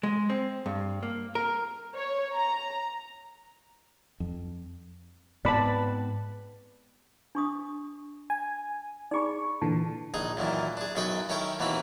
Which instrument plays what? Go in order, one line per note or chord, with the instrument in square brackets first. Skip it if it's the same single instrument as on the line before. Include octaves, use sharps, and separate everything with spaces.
[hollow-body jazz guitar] G#3
C4
G2
A#3
A#4
[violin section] C#5
A#5
[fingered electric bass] F2
[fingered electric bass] G#2 B3 C4 [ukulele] B4 A5 [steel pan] D5 B5
[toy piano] D4 C#6 D#6
[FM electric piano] G#5
[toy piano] D#4 G#4 B5 [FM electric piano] D5 C#6
[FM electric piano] A#2 D3 E3 [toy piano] A5
[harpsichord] A#1 D#4 G#4
F#2 A#2 D#3 E3
D4 G#4
B1 F#2 F#4 D#5 G5 B5
D#3 C#4 E4 A4 G5
D#2 B2 E3 A#3 C4 B5